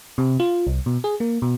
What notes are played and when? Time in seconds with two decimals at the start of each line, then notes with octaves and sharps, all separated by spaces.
0.18 C3
0.40 F4
0.67 C2
0.86 B2
1.04 G#4
1.20 A#3
1.42 B2